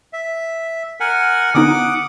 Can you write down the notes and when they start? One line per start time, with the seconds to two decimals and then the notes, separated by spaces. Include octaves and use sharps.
0.13 E5
1.00 A#4 F#5 G#5
1.55 D3 B3 D#4 F#5 D6 D#6